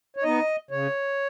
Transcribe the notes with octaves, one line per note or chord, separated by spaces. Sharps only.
C#5
B3 D#4 D#5
C#3 C#5